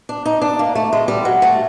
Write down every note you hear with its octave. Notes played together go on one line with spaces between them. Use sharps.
D4
D#4
D4
A#3
A3
G#3
G3
F#3
A3